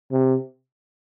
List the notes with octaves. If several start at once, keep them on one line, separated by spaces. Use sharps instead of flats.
C3